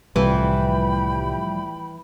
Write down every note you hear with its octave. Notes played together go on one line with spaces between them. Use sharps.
C2 A2 C3 E3 F3 G3 G5 B5